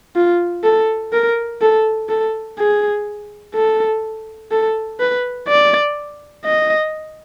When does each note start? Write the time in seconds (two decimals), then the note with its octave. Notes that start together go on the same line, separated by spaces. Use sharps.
0.16 F4
0.64 A4
1.13 A#4
1.61 A4
2.10 A4
2.58 G#4
3.55 A4
4.52 A4
5.00 B4
5.48 D5
6.45 D#5